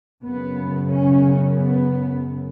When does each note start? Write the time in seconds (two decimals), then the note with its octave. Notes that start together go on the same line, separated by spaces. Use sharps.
0.23 F#2 C#3 B3
0.90 C#4
1.57 B3